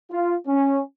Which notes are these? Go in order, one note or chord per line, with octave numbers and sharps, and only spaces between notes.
F4
C#4